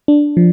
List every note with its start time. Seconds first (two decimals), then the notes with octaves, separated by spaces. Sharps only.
0.08 D4
0.37 F3